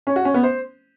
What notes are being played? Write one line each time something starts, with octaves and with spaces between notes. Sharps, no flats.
C#4
F#4
C#4
B3
C5